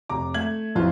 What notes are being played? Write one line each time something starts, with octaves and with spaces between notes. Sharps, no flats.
F1 A#5 D6
A3 E5 G#6 F#7
A1 F2 E3 F4